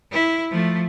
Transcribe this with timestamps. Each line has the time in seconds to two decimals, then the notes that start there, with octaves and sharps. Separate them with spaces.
0.11 E4
0.51 F3 A3